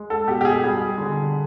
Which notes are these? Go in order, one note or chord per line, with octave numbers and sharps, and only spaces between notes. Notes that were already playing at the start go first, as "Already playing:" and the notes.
Already playing: G#3
A4
B2 G4
G4
G#4
G3 G#4
D3